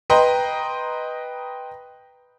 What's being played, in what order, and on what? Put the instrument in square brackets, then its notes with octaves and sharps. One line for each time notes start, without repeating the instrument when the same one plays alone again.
[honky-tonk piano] B4 D#5 G5 A#5 C6